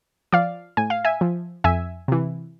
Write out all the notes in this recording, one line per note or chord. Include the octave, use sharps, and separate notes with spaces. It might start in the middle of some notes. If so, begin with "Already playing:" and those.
F3 D5 F5
A2 G#5
F5
E5 G#5
F3
F2 E5 G#5
C3 E3